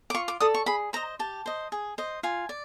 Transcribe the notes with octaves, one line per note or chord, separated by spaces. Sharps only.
D6
F4 C#6
D6
A4 D5 D#6
C#6
G#4 B5
C5 D#5 A#5
G4 A5
C5 D#5
G#4
C5 D#5
F4 G#5
D5